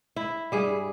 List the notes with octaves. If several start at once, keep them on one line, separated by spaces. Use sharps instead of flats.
E4
G2 G3 G#4